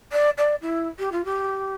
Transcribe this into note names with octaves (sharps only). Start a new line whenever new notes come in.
D5
D5
E4
G4
F4
G4